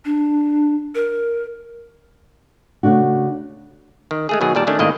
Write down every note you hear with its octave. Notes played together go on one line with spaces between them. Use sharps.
D4
A#4
C#3 A3 D4 F#4
D#3
G#3 A3 G#4
B2 D#3 F#3 G#4
A#2 D#3 G3 D5 A5
D#3 A3 C#4 D4
G#1 A2 D#3 A#3 D#5